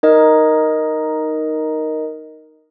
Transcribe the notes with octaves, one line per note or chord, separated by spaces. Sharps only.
D#4 A#4 D#5